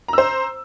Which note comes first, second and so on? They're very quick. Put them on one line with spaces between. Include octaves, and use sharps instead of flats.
A#5 E6 C5